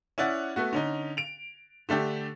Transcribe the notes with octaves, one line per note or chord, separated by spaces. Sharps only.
C#4 E4 D5 F#5
A3 B3 F#4
D3 C#4 D#4
D7 F7
D3 A3 D4 G4